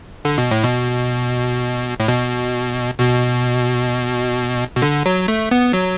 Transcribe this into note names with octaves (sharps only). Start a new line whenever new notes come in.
D3
B2
A2
B2
A2
B2
B2
B2
D3
F#3
A3
B3
F#3